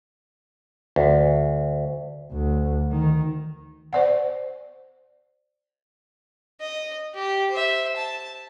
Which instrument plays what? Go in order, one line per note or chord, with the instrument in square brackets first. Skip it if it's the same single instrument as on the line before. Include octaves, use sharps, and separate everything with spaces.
[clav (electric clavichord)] D2
[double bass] D2
D#3
[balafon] C5 D5 F#5
[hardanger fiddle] D#5
G4
C5 E5
A5